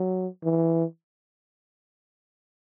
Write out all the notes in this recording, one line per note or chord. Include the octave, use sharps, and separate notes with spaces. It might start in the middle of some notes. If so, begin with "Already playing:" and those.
Already playing: F#3
E3